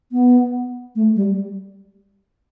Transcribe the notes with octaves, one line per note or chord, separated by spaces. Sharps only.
B3
A3
G3